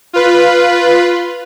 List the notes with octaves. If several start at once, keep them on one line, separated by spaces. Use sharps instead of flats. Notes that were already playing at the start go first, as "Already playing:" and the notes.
F4 B4